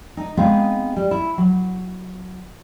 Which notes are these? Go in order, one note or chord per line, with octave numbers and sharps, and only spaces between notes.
D#4
G#3 B3 C4 D#4 G#4 F5
G3
E4
F#3